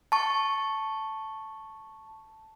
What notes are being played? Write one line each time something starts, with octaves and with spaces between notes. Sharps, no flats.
A5 C#6